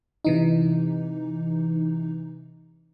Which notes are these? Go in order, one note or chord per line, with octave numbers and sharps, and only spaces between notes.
C3 E3 D#4